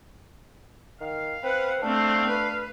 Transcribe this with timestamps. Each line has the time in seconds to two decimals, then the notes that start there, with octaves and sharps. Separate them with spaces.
1.01 D#3 F5
1.43 C4 B4 F#5
1.82 A3 C4 D4 F5
2.29 B4